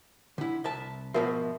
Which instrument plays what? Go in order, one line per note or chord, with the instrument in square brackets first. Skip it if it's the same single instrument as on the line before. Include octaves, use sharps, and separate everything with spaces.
[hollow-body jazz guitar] D3 E4
C2 E5 A5
[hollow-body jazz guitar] G#2 B2 F3 [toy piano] F#4 A#4 E5